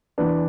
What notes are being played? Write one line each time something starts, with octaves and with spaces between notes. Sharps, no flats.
E2 E3 D4 B4